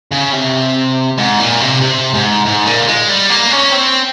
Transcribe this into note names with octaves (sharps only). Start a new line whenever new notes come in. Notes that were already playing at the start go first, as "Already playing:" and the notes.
C#3
C3
G#2
A#2
C3
C3
G#2
G#2
A#2
G#3
G3
A#3
C#4
C4